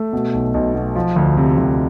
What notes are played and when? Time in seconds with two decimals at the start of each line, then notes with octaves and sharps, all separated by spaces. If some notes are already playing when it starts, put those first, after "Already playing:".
Already playing: A3
0.13 B2
0.34 B1
0.54 B1
0.75 B2
0.96 F3
1.16 D2
1.37 C3
1.58 D2